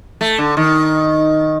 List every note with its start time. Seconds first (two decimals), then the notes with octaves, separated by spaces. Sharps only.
0.21 A3
0.38 D3
0.57 D#3